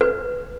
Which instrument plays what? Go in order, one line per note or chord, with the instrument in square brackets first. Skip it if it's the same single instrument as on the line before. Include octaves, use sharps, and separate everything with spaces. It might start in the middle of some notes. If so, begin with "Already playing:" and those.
[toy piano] B4